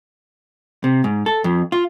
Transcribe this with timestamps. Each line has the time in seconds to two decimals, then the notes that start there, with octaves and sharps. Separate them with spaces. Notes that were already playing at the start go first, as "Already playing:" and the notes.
0.84 C3
1.04 G#2
1.26 A4
1.44 F2
1.72 F4